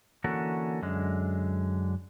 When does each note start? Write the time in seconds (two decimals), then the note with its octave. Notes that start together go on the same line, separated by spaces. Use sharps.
0.24 D3 E3 A#3 C#4 F#4 A4
0.82 F#2 D3 G#3